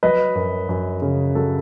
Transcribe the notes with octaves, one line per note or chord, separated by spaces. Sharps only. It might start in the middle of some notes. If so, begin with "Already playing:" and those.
F#3 B4 D#5
F#2
F#2
C#3
F#3 F#4 A4